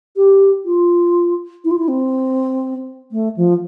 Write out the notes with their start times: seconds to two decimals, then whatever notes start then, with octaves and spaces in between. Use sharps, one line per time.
0.16 G4
0.65 F4
1.64 E4
1.71 F4
1.78 E4
1.88 C4
3.11 A3
3.36 F3